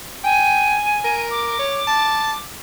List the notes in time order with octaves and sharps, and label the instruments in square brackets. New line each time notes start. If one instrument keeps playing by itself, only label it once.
[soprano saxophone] G5 [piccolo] G#5
[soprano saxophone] A#4
[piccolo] D6
[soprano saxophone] C#5
A5